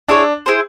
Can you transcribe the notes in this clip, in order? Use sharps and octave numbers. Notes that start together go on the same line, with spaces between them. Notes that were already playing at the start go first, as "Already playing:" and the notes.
D4 E4 G#4 C#5
E4 G#4 C5